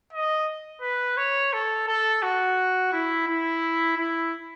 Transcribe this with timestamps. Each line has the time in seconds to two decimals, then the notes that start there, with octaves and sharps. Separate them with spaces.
0.13 D#5
0.82 B4
1.17 C#5
1.53 A4
1.87 A4
2.22 F#4
2.93 E4
3.27 E4
3.97 E4